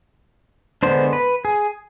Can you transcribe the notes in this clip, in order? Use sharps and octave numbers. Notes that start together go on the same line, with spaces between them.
D3 G#3 B3 D4 C5
B4
G#4